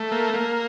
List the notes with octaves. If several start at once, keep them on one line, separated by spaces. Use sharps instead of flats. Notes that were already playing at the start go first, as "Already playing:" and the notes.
Already playing: A3
A#3
A#3